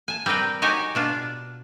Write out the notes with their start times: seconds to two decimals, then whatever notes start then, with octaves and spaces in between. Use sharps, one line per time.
0.08 G#5 A5
0.26 G3 C4 A#4 B4 G5
0.62 D#4 F#4 G4 C#5 G5 G#5
0.95 B2 D4 F4